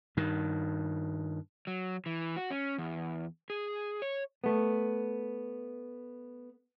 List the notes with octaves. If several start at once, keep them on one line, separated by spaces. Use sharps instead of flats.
G2 D#3
F#3
E3
F#4
C#4
E2
G#4
C#5
A3 B3